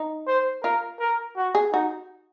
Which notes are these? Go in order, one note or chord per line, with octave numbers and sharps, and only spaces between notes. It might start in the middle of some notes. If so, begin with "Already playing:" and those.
Already playing: D#4
C5
F4 A#4
A#4
F#4
G#4
D#4 F#4